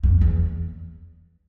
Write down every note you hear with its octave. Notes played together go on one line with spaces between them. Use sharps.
F2
E2